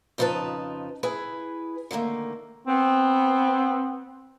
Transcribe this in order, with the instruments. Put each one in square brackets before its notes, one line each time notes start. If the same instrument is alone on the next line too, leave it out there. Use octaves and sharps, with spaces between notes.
[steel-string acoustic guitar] F2 C#3 F3 D#4 B4 A5
E4 G#4 B4 G#5
D3 D#3 A3 A#3
[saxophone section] B3 C4